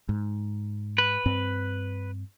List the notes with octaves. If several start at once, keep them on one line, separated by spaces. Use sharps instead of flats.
G#2
B4
G2 C4